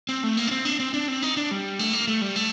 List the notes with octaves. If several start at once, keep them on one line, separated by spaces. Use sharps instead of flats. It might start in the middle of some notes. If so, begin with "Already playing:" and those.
C4
A3
A#3
D4
C4
D4
C4
D4
C4
D#4
D4
G3
A3
A#3
A3
G3
A3